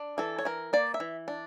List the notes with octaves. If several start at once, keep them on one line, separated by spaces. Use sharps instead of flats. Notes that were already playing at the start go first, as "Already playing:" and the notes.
Already playing: D4
E3 A4
C#5
E3 A#4
A#3 D5
E5
E3
D4